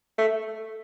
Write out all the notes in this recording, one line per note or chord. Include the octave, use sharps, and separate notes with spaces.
A3